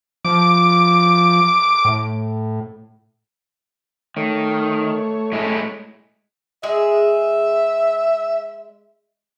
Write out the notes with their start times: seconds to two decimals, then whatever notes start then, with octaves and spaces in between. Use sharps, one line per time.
0.25 F3 D6
1.85 A2
4.17 D#3 A3 C#5
5.32 A2 G#3 E4
6.63 G#3 G#4 E5